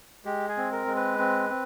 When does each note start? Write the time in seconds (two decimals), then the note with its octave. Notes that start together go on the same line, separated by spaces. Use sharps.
0.25 G#3 G4
0.49 G#4
0.57 C4
0.72 A#4
0.87 G#3
0.96 B4
1.19 C4
1.50 C4